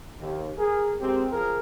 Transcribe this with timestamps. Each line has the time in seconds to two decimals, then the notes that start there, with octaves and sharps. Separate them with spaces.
0.20 D#2
0.58 G#4 A#4
1.00 G#3 C4 G4 A#4
1.30 F3 G#4 A#4